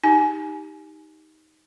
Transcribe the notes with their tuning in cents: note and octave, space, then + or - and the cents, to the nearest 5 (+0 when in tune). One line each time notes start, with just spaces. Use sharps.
D#4 +15 G4 +0 G#5 +20